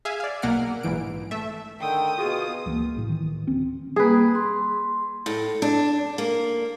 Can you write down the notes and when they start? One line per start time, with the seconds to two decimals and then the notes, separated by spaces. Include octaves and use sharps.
0.05 G#4 E5 F5 G#5
0.20 D5 F5
0.42 B1 B2 A#3 F#5 F6 D7
0.83 A#1 G#2 E3 D7
1.31 A3 E5
1.81 D3 D#3 G5 D#6
2.18 B2 F4 F#4 G#4
2.66 C#2 E3 F#3 A#3
2.95 C2 A2
3.09 D#3 E3
3.47 D2 C4 C#4
3.96 G3 A#3 G#4 B4
4.35 C6
5.26 A2
5.62 D4
6.18 A#3